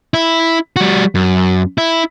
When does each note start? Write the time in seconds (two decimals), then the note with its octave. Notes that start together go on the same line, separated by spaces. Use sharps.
0.14 E4
0.76 G3 F#4
1.15 F#2
1.78 E4